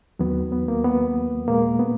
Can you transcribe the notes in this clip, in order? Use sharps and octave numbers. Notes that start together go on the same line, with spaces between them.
D#2 D#3 F#3 B3
B3
A#3
B3
A#2 G#3 A#3
B3